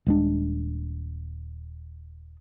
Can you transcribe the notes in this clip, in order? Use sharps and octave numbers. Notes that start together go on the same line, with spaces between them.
D#1 G#3 D4